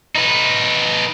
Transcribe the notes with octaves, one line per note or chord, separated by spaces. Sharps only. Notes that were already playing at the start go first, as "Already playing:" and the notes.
D#4 B4